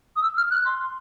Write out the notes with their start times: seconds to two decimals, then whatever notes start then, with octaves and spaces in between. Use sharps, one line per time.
0.16 D#6
0.22 E6
0.37 F6
0.51 F#6
0.65 C6